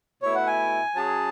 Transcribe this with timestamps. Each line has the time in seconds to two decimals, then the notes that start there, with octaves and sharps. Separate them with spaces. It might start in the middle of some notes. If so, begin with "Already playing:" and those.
0.22 B2 A3 E4 C#5
0.35 F#5
0.47 G#5
0.95 F#3 C#4 G#4 A5